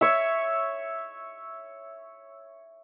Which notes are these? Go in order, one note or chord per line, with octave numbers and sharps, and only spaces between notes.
C#5 E5